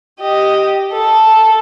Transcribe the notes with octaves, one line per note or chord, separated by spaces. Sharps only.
G4 D#5
A4